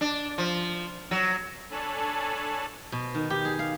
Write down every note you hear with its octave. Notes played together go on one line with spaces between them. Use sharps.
D4
F3
F#3
D4 A4 C#5 G#5 A5 B5
B2
D#3
G4
G#4
F5